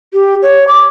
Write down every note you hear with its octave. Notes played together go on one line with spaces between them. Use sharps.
G4
C#5
D6